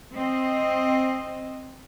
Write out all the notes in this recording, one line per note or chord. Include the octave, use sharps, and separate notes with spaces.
C4 D#5